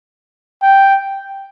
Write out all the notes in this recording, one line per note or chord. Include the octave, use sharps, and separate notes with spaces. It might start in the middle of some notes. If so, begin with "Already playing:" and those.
G5